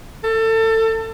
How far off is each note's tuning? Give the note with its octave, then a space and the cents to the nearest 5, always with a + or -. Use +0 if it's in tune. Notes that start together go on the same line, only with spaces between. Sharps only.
A4 +25